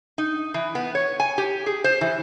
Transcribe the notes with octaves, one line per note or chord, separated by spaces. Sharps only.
D#4
E3
B3
C#5
G#5
G4
G#4
C5
E3